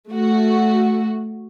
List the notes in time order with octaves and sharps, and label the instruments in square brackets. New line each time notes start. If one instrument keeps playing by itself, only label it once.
[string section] A3 F#4